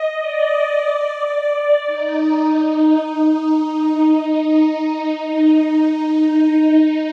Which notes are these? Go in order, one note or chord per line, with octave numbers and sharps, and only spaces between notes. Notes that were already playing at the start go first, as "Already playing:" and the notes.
Already playing: D#5
D5
D5
D5
D#4